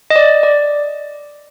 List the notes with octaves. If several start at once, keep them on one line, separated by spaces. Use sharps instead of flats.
D#5
D5
D5